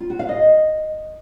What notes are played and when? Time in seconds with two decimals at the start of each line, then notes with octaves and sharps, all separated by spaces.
0.01 F4
0.10 F#4
0.19 F5
0.29 D#5